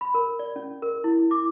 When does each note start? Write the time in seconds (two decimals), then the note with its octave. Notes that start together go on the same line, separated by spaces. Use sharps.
0.01 B5
0.14 A#4
0.39 D5
0.56 C#4
0.82 A#4
1.04 E4
1.31 D6